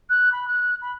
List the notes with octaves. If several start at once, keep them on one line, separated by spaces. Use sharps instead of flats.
F#6
B5
F#6
B5